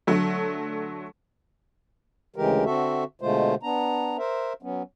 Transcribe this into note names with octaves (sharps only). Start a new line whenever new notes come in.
D3 F#3 A3
D2 C#3 E3 G#3 G4 A#4
D3 C4 F#4 A4 E5
B2 D3 G#3 A3 F4 C5
B3 D4 A#5
A#4 C5 E5
F#3 B3 C#4